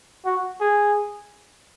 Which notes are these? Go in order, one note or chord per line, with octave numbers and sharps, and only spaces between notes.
F#4
G#4